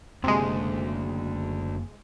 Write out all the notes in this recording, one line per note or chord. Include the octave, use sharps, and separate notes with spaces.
F#1 D2 C3 G#3 A#3